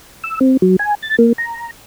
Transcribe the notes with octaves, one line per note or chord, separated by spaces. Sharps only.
E6
C4
F#3
G#5
A6
A#3
A#5